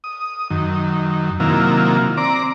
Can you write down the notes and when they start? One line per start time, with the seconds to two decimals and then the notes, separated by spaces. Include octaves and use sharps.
0.04 D#6
0.50 F#2 D#3
1.40 C3 D#3 F#3 A#3 E4 F4
2.17 C4 D5 A#5 D6